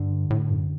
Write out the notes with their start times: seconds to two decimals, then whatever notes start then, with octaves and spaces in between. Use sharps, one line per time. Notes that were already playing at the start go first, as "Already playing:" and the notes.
Already playing: G2 D3
0.30 A2
0.50 F#2